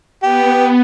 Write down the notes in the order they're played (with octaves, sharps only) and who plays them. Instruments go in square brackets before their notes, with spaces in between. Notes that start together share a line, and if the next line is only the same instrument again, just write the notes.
[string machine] B3 [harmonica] G4